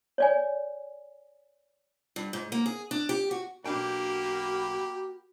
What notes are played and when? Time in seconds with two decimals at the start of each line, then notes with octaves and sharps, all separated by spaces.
0.18 C#5 D5 G#5
2.16 G2
2.33 G#2
2.52 A#3
2.66 G#4
2.91 D4
3.09 G4
3.31 F#4
3.66 B1 A#3 D4 F#4 G4 G5 B5